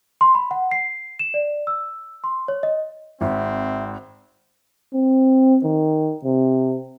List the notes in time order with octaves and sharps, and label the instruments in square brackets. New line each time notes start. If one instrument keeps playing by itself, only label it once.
[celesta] C6
B5
F#5
C7
E7
D5
E6
C6
C#5
D#5
[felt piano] G#1 [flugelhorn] C4 [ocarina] E5
[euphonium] C4
D#3
C3